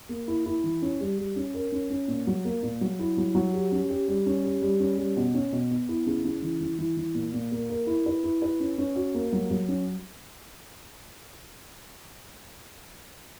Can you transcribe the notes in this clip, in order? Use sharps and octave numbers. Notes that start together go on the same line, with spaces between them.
A#3
E4
E4
E3
C#4
G3
G3
C#4
A#4
C#4
C#4
A#2
F#3
A#3
A#2
F#3
E4
F#3
F#3
G4
C#4
G4
G3
C#4
G4
G3
C#4
G3
B2
C#4
B2
B3
E4
C#3
C#3
E3
E3
E3
E3
A#2
A#2
A#3
A#4
E4
B4
E4
B4
C#4
C#4
F#4
A#3
F#3
F#3
C#4